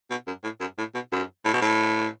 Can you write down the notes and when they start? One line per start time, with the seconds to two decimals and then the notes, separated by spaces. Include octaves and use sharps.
0.10 B2
0.27 F#2
0.43 A2
0.60 F#2
0.78 A2
0.94 B2
1.12 F#2
1.45 A2
1.53 B2
1.61 A2